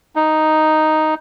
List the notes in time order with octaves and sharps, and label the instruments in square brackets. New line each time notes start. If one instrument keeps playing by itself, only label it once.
[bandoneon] D#4